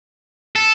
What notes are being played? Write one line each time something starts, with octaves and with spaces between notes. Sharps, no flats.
A4